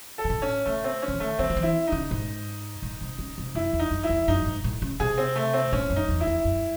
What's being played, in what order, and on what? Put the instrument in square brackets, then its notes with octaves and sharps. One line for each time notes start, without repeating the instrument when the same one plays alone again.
[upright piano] A4
[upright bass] C3
A2
[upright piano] C#4
[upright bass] C#3 [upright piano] A3
[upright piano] C4
C#4
[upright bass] C#3
D#3
[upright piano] A3
[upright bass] D#3 [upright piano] C4
[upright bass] D#3
E3
[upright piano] E4
[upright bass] C#3 [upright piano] D#4
[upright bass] G#2
A2
C3
C#3
C3
[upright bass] F#2 [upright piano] E4
[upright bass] E2
[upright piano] D#4
[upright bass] F#2
[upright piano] E4
[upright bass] E2
[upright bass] F#2 [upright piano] D#4
[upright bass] G#2
A2
C#3
[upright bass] C3 [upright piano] G#4
[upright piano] C4
A3
C4
[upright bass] A2 [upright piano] C#4
[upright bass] F#2
[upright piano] D#4
[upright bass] E2
[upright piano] E4
[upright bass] E2
F#2